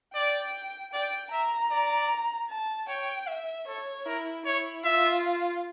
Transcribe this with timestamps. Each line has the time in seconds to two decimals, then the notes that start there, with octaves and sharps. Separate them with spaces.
0.14 D5 G5
0.93 D5 G5
1.32 E5 A#5
1.71 D5
2.49 A5
2.88 C#5 G5
3.28 E5
3.67 A4 C#5
4.06 E4 A#4
4.46 E4 C#5
4.84 F4 E5